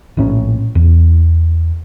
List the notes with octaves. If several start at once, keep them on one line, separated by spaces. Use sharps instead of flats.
A#1 A2 C#4
E2